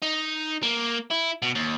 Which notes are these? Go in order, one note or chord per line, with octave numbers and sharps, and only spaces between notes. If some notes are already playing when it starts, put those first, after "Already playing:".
D#4
A#3
E4
B2
D#2